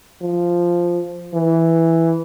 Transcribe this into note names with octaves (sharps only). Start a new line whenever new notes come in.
F3
E3